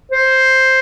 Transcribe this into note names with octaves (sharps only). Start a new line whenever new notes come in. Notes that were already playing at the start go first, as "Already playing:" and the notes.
C5